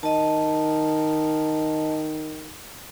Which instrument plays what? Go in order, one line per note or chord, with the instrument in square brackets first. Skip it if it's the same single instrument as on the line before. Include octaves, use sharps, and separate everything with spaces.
[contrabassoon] D#3 [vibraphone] D#5 A5